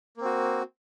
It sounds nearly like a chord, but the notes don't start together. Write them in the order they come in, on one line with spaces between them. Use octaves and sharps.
A#3 C4 F#4